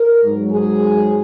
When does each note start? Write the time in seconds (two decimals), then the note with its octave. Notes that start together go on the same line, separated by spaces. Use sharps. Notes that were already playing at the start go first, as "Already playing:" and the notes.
Already playing: A#4
0.23 G#2 F#3
0.51 G#4